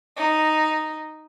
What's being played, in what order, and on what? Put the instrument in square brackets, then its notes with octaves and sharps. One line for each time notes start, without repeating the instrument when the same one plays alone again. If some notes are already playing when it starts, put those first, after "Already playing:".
[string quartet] D#4